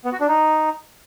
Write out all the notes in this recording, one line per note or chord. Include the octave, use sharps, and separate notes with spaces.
B3
F#4
D4
D#4